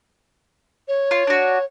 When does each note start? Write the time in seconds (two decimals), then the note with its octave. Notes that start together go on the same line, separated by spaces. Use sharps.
0.88 C#5
1.11 F4
1.27 D4 F#4